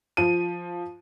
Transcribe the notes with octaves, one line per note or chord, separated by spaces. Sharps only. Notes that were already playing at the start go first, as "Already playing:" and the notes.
F3 D#7